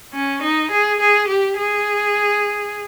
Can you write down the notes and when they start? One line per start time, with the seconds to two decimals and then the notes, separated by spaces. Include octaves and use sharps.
0.14 C#4
0.42 D#4
0.71 G#4
1.00 G#4
1.28 G4
1.57 G#4